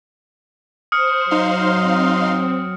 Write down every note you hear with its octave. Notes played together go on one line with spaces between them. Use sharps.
C5 D#6 F6 C#7
F#3 D#4 F5 C6
C4